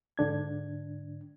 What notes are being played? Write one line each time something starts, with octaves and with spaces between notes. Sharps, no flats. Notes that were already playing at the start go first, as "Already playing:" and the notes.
G#2 D3 D4 G#6